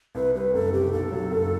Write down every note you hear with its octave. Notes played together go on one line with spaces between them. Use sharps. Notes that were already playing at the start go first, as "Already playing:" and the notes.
C2 B4
G3 B4
F#1 A4
C3 G4
B1 A4
F#3
F#1